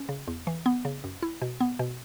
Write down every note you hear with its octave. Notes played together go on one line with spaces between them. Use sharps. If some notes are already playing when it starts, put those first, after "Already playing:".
Already playing: C#4
C#3
E2
E3
B3
C#3
F#2
E4
B2
B3
B2